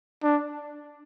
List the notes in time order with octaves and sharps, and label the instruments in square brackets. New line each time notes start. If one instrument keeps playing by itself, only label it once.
[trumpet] D4